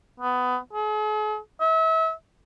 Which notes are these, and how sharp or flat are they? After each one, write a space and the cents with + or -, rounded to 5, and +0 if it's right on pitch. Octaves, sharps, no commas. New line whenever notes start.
B3 +20
G#4 +45
E5 -35